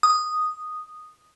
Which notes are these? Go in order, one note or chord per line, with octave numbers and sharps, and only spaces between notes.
D#6